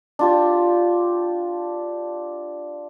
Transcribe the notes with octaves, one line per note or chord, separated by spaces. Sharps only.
D4 F4 G4